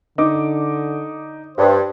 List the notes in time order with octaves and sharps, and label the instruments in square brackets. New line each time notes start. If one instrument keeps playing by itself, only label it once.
[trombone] D3 [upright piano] D#4 D6
[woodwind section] G2 [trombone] C5